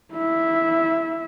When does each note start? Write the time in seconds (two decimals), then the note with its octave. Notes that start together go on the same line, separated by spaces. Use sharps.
0.14 E4 E5